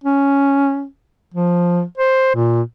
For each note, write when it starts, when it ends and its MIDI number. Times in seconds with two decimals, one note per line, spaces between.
0.04 0.86 61
1.34 1.83 53
1.98 2.34 72
2.35 2.62 46